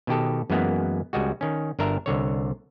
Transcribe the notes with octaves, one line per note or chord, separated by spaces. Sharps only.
B2 D#3 G4 A4
F#2 E3 G#3 A#3 B3
C#2 G3 G#3 F#4
D#3 C#4
G1 D4 A#4 E5 A#5
C2 D3 C#5